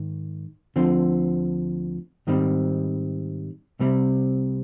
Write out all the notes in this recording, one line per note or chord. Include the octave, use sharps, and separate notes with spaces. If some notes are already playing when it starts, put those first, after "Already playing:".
Already playing: G#2 D#3
D2 D3 F3 C4
G#2 D#3 G3 C4
C2 C3 G3 C4